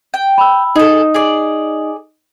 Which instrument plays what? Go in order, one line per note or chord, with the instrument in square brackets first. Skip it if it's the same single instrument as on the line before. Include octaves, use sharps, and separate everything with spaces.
[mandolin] G5
[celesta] B5 E6
[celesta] D#4 D#5 D#6 [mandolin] G#4 A4
[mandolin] G#4 D5